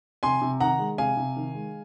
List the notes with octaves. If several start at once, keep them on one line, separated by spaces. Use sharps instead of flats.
C3 G#5 C6
C3
D#3 F#5 A#5
G#3
C3 F5 G#5
C3
D#3
G#3